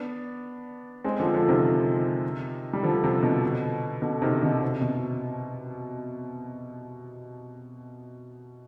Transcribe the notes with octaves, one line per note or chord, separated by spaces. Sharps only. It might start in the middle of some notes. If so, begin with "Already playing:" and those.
Already playing: B3 D4
G#3 C4
D3 F3
D3 F3
C3 D#3
G3
D3 F3
C3
B2 D3
B2 D3
C3 D#3
B2 D3
C3
B2